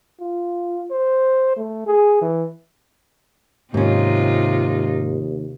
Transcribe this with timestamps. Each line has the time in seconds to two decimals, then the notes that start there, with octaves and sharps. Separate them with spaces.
0.21 F4
0.91 C5
1.57 A3
1.87 G#4
2.22 E3
3.74 D#2 G#2 C3 C#4 D#4 F4